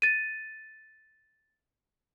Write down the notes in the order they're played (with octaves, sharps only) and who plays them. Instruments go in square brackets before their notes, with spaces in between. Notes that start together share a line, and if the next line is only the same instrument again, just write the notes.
[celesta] A6 D#7